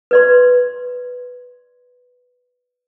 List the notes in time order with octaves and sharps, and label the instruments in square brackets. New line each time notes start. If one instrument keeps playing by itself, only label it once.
[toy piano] B4 D5 C6